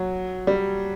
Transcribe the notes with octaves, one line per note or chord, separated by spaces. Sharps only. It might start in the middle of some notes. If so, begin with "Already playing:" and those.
Already playing: F#3
G3